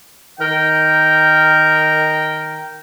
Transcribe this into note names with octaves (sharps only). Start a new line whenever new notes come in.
D#3 A#4 G5